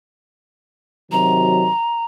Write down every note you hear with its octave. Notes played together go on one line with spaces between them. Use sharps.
C3 D#3 F#3 A#5